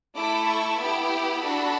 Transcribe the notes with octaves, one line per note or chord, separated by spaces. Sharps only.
A3 E4 A4 D6
C#6
B3 E4 G4 B5
D4 F#4 A4